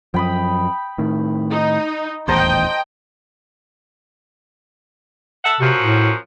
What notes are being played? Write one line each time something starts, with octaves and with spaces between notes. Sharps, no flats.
F#2 F3 G5 B5 D#6
A2 D#3
D#4
D#1 A1 E2 C5 D#5 G5 A5 A#5
A4 E5 F#5
F#2 C3 F3 F#4
A2